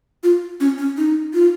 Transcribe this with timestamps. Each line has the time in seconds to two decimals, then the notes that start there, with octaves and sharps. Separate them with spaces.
0.23 F4
0.60 C#4
0.78 C#4
0.97 D#4
1.34 F4